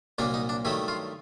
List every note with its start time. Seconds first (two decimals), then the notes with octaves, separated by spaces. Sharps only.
0.18 C2 A#2 F#3 A#3 D4
0.34 D#4
0.49 D4
0.65 G2 D#3 F#3 A3 E4
0.88 F4